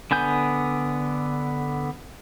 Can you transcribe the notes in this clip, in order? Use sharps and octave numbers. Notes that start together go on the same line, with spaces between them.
D3 B3 G#5 G6